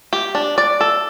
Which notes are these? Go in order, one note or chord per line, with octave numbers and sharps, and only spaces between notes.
G4
D4
D5
A4